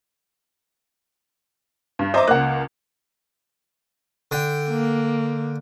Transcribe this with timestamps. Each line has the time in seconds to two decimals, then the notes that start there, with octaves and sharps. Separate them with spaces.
1.99 G2
2.14 C5 D#5 E5 A#5 D6
2.28 C#2 A#3 F#5 F#6
4.31 D3 G5
4.70 A#3